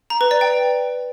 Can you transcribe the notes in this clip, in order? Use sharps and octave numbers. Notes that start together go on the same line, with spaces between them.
A#5
B4
D5
G5